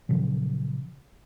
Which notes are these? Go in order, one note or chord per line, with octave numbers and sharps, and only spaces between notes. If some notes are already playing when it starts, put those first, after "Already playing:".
A#2 C#3 F3 F#3